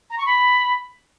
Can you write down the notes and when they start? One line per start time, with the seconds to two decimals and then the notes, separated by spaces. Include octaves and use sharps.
0.10 A#5
0.18 C#6
0.26 B5